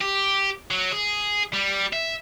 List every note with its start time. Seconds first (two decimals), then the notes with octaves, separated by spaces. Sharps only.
0.01 G4
0.71 F#3
0.92 G#4
1.54 G3
1.93 E5